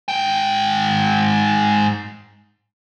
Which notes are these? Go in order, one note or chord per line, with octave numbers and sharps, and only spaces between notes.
G#2 G5